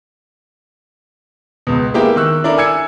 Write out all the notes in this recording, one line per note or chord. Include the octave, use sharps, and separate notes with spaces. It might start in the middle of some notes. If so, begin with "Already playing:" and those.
C#2 B2
G#3 A#3 B3 E4 G4 A#4
D#3 C#6 E6 F#6
D4 E4 A4 A#4 D5
G#5 E6 G#6 C#7